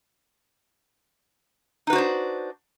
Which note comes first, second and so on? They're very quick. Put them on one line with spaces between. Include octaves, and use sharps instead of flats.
D#4 B4 F#4 C5 D4